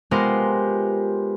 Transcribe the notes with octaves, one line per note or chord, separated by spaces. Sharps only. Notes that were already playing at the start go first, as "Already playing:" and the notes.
G#3 B3 F4 G4 A#4 C5